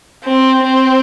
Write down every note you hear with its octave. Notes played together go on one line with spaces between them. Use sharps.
C4
C4